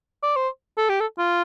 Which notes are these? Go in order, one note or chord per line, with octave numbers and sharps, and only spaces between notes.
D5
C5
A4
G4
A4
F4